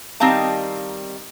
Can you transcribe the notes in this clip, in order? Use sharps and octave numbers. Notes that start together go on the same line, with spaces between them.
D#3 G3 C4 D#4 F5 A5